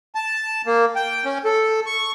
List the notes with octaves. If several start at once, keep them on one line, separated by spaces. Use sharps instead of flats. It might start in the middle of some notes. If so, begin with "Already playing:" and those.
A5
A#3
G5
C#4
A4
C#6